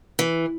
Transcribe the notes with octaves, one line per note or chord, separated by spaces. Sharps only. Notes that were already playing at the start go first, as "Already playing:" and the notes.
E3